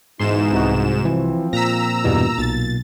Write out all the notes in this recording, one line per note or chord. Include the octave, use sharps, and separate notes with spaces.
G#2 B2 E3 D#4 C6 E7
C2 F#4
E3 F3 C4
A#2 A#5 E6 A#6 B6
E2 G2 B2
B1 A6